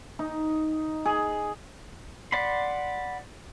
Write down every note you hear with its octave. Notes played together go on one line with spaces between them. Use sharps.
D#4
G#4
D5 F#5 B5 C6